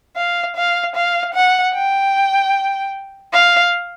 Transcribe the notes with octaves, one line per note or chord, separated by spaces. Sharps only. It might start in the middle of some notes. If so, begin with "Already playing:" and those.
F5
F5
F5
F#5
G5
F5